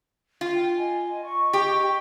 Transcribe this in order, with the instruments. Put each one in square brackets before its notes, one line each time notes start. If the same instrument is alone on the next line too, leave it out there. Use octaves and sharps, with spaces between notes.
[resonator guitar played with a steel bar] F4
[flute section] G5
D#5 G#5
D#5 C#6
[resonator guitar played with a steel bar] G4